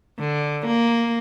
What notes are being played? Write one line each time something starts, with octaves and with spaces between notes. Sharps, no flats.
D3
A#3